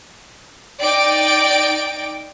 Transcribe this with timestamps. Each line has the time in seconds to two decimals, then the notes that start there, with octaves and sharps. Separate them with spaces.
0.80 D#4 D5 G5 D7